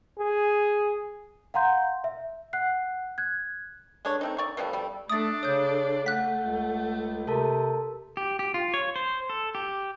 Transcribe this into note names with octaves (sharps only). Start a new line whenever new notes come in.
G#4
F5 F#5 A#5 C6 G6
E5
F#5 F#6 C7
F#6 G#6
G#3 A3 D4 C#5
A3 C4 D#4
D5 A#5 C#6
B2 F3 G3 A3
G3 A3
A3 D4 A4 D#6 A6
C#3 C#5 D#6 G6
A3 F#5 F#6 B6
C#2
C3 A4 A#4 A5
G4
G4
F4
C#5
C5
A4
G4